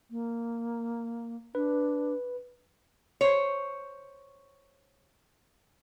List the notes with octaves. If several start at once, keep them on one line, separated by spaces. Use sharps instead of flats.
A#3
D4 B4
C5 C#5